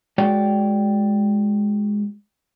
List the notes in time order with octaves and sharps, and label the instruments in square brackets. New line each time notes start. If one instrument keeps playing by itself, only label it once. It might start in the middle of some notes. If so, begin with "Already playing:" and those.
[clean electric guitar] G#3 F#4 C#5 D5 G5